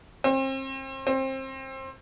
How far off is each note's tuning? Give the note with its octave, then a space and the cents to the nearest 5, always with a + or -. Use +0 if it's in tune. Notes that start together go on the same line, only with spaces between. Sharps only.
C4 +35
C4 +25